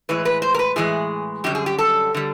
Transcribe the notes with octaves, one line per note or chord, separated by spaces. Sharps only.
A2 E3 G#3 B4
B4
C5
A#4
B4
A2 E3 G#3 G#4
F#2 D3 G3 G4
G#4
G4
A4
D3 G3